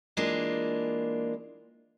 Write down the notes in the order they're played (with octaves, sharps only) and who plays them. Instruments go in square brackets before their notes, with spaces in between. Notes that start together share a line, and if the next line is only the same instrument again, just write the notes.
[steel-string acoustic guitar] E3 G#3 A#3 D4 F4